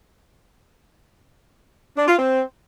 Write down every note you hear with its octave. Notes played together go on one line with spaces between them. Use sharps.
D4
F4
C4